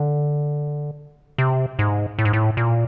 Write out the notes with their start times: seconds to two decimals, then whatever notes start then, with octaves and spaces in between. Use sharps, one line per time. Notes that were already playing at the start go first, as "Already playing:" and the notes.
Already playing: D3
1.38 C3
1.79 G#2
2.19 A2
2.25 G#2
2.33 A2
2.57 A#2